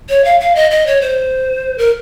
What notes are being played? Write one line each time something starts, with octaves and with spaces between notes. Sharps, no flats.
C#5
F5
F5
D#5
D#5
C#5
C5
A#4